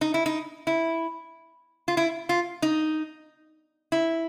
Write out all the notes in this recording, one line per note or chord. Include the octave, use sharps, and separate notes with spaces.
D#4
E4
D#4
E4
F4
E4
F4
D#4
E4